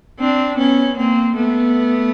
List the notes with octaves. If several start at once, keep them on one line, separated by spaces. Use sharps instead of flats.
C4 D4
B3 C#4
A#3 C4
A3 B3